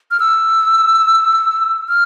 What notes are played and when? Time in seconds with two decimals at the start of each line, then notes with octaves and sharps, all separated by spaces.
0.11 F6
0.20 E6
1.89 F6